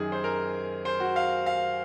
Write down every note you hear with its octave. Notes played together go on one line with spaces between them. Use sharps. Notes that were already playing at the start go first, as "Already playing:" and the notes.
Already playing: F#2 D#3 G#4
C5
A#4
C5
F#4
F5
F5